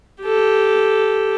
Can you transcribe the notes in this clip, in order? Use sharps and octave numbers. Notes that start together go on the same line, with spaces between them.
G4 A4